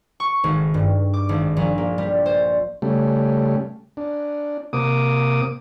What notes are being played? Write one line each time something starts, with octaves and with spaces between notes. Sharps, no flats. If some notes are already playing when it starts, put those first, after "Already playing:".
C#6
G#1
G2
D6
G#1
A#1
A#3
G3
C5
C#3 G3 A3
D4
C3 A#3 D6 D#6